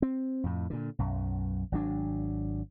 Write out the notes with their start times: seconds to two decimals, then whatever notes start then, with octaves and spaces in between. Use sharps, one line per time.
0.02 C4
0.44 F2 A2
0.70 A#2 D3
0.99 B1 F#2
1.72 G#1 F#3 D4